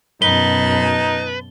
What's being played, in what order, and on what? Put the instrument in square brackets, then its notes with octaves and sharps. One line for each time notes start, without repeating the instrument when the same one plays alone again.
[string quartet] F#2 B2 A5 [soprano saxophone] D#4 [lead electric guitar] B4 [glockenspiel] G7